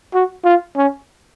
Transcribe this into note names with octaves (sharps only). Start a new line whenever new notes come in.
F#4
F4
C#4